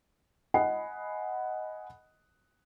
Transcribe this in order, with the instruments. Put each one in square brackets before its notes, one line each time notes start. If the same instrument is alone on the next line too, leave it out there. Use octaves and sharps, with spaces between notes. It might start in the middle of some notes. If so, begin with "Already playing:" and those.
[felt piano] D#5 F#5 G#5 B5 C7